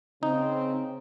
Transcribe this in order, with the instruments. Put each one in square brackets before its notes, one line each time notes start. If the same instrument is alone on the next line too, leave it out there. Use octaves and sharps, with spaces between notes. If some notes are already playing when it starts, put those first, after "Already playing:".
[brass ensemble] C#3 C4 [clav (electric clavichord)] D#4